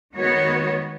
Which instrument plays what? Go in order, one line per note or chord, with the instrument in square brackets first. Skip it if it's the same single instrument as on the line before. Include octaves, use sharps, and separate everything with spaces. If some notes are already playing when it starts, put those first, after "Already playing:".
[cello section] D#3 G#3 B3 F#4 C#5